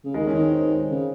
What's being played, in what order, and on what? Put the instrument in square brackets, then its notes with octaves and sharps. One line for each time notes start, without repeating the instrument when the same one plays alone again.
[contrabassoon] C#3
[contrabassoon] D#3 [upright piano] G#3
[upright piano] C#4
[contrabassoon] D#3
[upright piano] C#4
C4
G#3
[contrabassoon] C#3